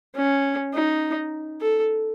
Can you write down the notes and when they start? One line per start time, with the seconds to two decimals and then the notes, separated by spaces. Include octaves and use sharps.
0.15 C#4
0.73 D#4
1.61 A4